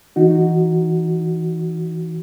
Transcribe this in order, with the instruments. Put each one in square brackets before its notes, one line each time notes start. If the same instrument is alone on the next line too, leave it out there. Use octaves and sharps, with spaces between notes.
[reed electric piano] E3 D#4 F#4